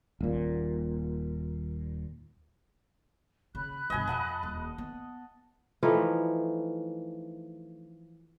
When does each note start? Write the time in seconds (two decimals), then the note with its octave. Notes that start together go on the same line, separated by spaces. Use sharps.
0.21 D#1 A#2
3.55 C#3 B5 F#6
3.90 G2 B2 D#5 G#5
4.07 F2 D#5 F#5 A5
4.43 D#1
4.78 B3
5.83 E3 F3 A3 D#4